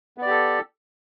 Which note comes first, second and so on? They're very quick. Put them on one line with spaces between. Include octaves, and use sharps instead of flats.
B3 D5 G4 A4